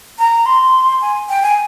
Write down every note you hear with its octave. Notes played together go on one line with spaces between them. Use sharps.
A#5
C6
G#5
G5
G#5